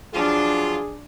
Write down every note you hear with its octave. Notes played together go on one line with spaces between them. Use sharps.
F3 F#3 D4 F4 G#4